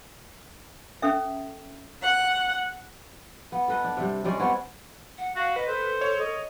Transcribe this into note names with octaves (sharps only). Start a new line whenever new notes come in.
C#4 A4 E5
F#5
B3
A4 B4 D#5
D4
C3 G3
G3 G#3 C#4 D5
B3 C4 C#5 D5
F#5
F#4 F5
B4 D#5
A4 C5
C#5
D#5